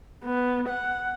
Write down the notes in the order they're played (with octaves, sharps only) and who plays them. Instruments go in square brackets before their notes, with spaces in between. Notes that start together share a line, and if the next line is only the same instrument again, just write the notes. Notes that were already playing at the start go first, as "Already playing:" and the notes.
[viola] B3
F#5